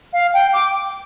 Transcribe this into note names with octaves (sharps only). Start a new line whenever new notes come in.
F5
G5
D6